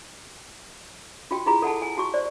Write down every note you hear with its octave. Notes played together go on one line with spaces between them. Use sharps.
F4 F#4 G5
E4 F4 G#4 A#5
A4 F#5 G#5 A5
G#5
F#4 C#6
C5 D5